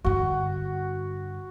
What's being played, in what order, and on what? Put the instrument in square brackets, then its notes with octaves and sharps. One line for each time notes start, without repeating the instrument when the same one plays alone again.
[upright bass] G2 D3 [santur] F#4